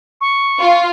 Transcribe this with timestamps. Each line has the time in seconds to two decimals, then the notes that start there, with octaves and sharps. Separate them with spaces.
0.20 C#6
0.60 F4